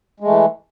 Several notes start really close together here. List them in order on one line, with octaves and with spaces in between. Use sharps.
G#3 A3 E3